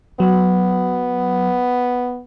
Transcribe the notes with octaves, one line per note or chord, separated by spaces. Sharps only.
F#3 B3